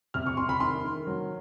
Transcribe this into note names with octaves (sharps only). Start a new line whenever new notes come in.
C3 F6
C#6
C3 C6
B5
D#3 C6
D#3
F#3